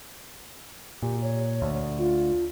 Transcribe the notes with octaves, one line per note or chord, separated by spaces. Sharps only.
A#2 G4
C#5
D2
F4